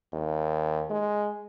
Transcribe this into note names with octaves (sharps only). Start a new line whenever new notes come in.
D#2
G#3